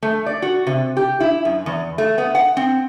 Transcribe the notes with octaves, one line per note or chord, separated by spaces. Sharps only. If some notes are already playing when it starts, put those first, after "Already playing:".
A3
D5
F#4
C3
G4
E4
F#2
E2
A3
B3
F#5
C4